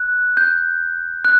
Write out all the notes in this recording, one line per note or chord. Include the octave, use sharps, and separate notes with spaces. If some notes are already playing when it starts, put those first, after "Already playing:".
Already playing: F#6
G6
F#6